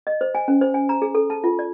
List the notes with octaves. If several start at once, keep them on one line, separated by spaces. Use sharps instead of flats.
D#5
C5
G#5
C#4
C5
G#5
A#5
G#4
A4
A5
F4
D5